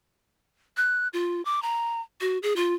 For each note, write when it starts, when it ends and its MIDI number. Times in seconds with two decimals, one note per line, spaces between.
0.77 1.08 90
1.13 1.44 65
1.45 1.62 86
1.62 2.01 82
2.21 2.38 66
2.43 2.54 68
2.56 2.75 65